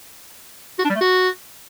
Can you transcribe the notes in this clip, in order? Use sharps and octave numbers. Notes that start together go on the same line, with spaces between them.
F#4
D4
G3
A3
F#4